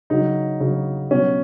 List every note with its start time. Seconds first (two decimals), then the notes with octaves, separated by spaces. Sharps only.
0.10 C#3 F#3 D#4
0.60 C#3 F#3
1.11 B2 F#3 C#4